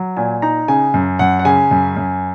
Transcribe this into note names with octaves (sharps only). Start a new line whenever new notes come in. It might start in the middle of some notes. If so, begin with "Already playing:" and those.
Already playing: F#3
A#2 G#5
D#4 A#5
C#3 G#5
F#2
F#2 F#5
F#5
C#3 G#5
F#2
F#2